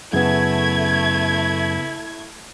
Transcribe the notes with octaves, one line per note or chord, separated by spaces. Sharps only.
F#2 C#3 A3 B3 E4 G#6